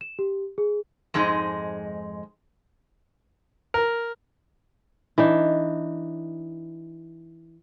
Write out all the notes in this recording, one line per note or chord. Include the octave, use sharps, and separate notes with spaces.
E7
G4
G#4
F2 G#2 G#3 D#4
A#4
E3 D4 D#4